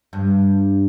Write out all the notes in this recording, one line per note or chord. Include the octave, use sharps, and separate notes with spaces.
G2